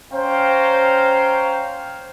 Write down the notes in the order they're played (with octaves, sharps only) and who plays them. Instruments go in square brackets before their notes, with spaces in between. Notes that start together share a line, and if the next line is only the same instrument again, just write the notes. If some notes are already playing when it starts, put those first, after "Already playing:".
[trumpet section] C#4 C5 F5 G5 A#5